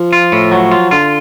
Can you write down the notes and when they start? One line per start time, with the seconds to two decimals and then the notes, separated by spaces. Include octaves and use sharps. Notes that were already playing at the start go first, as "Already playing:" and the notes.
Already playing: F3
0.13 F4
0.32 A2
0.52 F#3
0.71 F4
0.91 D3 F4